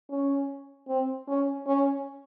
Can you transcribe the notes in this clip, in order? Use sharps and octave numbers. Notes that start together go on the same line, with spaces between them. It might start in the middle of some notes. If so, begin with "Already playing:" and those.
C#4
C4
C#4
C#4